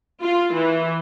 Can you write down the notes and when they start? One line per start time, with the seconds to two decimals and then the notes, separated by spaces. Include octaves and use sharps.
0.22 F4
0.54 E3